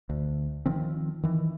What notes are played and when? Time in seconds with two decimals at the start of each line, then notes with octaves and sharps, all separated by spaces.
0.09 D2
0.66 D#3 F3 C4
1.23 D#3 E3